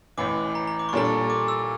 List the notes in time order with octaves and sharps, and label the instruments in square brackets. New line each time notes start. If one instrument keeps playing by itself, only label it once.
[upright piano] A1 A2 E3 [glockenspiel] D6
[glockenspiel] A#5
A#5
D6
C#6
[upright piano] A#2 G3 D4 A4 [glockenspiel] A#5
[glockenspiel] C#6
D6
E6